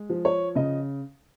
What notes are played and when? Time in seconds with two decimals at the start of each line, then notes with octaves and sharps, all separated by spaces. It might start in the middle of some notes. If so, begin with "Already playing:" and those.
Already playing: G#3
0.10 F3
0.25 C#5
0.55 C#3 D#5